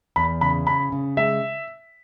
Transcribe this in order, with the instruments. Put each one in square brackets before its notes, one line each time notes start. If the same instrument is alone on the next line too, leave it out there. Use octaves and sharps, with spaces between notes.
[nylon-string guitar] E2 [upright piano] B5
[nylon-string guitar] C#3 [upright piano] B5
[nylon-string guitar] C#4 [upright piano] B5
[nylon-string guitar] C#3
[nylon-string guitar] G#3 [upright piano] E5